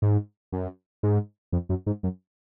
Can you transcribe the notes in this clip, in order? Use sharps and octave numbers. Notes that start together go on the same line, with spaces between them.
G#2
F#2
G#2
F2
F#2
G#2
F#2